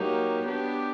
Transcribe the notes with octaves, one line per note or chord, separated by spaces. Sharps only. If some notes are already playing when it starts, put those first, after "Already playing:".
Already playing: F#3 A#3 D#4 G4
B3 D4 G4